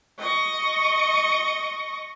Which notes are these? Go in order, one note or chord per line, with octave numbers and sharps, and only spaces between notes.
D#5 C#6